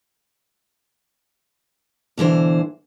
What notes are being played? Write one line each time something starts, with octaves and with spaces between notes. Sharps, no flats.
B2 D3 E3 C5